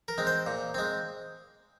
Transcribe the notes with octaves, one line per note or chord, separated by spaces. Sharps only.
A#4
G#3 C4
C5
A#2
G#3 C4